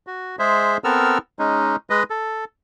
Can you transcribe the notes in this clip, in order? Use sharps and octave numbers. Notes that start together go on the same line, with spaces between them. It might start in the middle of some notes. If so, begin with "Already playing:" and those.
F#4
G#3 G#4 C5 E5
B3 C4 A4 A#4 E6 F6
G#3 C#4 D#4
G#3 B4 D#5
A4